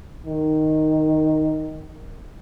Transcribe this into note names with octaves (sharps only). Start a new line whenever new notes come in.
D#3